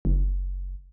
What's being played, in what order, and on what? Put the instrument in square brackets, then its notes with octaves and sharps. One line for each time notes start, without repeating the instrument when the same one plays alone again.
[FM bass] F#1